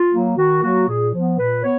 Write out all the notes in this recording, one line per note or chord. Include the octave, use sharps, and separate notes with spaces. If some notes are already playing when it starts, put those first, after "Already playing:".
Already playing: F4
F#3 A#3
D#3 F#4
F#3 A#3 F#4
A#2 G#4
F3 B3
A#2 B4
B3 C#5